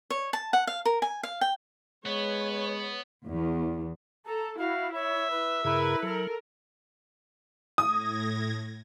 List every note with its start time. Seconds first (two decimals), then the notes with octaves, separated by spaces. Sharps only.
0.10 C#5
0.33 A5
0.53 F#5
0.67 F5
0.85 A#4
1.02 G#5
1.23 F5
1.41 G5
2.06 G#3 B3 B4 C#5
3.28 E2
4.26 A4 A#5
4.59 E4 F#4 F5
4.94 C#5 E5
5.31 B4
5.65 G2 C#3 E4 G#4 A#4 B4
6.03 F#3 A4 A#4
7.78 A2 D#6 G#6 A#6